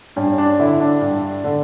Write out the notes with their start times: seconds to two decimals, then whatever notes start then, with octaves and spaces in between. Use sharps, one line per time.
0.16 G2 C#4
0.38 D4
0.59 D3 E4
0.80 D4
1.01 G2
1.44 D3